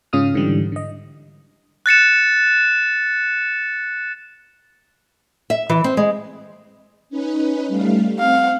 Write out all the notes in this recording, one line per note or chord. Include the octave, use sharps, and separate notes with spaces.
G#2 C#3 C#4 F4 D#6 F6
G#2 D3 E3 G3
D3 D#5
F#6 A6 C#7 E7
E5
E3
C4
G#3
C#4 D#4 B4
G3 A3 F5
C4 F5 F#5